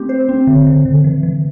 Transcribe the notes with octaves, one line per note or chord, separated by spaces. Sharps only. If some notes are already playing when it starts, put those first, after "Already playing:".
Already playing: A3 C4 G4
C5
C4
D3
D3
D3
E3
E3